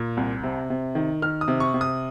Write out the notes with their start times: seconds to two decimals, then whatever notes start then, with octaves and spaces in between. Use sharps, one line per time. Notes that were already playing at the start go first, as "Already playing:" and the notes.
Already playing: A#2
0.17 C2
0.43 C3
0.70 C3
0.95 D#3
1.22 D#3 F6
1.41 D#6
1.48 C3
1.60 C#6
1.74 C3
1.81 D#6